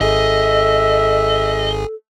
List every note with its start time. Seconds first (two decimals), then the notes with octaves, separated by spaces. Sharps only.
0.01 G#1 G#4 A4 D#5 E5